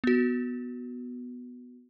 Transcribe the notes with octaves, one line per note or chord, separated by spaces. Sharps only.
B3 F#4